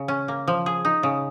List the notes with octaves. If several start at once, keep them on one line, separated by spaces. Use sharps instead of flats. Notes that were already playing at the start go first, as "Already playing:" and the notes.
Already playing: C#3
C#4
A#3
F3
G#4
D#4
C#3